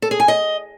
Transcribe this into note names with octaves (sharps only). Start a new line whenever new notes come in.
A4
G#4
G#5
D#5